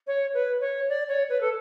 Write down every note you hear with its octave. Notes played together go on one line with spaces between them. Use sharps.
C#5
B4
C#5
D5
C#5
B4
A4